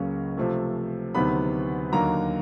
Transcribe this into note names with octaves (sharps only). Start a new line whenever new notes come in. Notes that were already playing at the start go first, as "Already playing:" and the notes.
Already playing: C#2 C#3 F#3 A#3 C#4
C3 F3 A3
D2 C3 D#3 F#3 B3 B5
D#2 D3 F#3 A#3 A#5